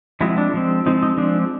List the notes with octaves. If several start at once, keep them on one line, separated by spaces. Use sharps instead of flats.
F3 G#3 C4 E4 F#4
D4
F3 G#3 C4
F3 G#3 C4 D#4
D#4
F3 G#3 C4 D4